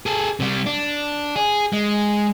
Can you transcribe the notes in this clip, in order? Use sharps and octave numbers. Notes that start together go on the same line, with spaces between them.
G#4 A4
C3 G3
D4
G#4
G#3